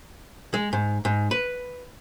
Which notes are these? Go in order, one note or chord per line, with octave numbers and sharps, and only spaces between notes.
G#3
G#2
G#2
B4